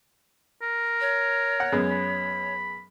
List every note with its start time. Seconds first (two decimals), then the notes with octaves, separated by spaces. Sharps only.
0.62 A#4
1.01 C#5
1.60 F#5
1.72 F#2 G#3 B3
1.91 B5